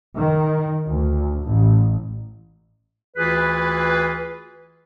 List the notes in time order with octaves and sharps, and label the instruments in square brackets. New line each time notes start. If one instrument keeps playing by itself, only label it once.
[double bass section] D#3
D2
A1
[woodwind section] D2 E3 F4 G#4 B4